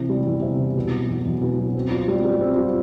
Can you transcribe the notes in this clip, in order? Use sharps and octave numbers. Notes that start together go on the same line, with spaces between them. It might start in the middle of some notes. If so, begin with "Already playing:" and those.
Already playing: C3 E3
G3
E2
C3
E3
B2
F#3
E2
E2
B2
F#3
C4
F4
G3
G3
C4
F4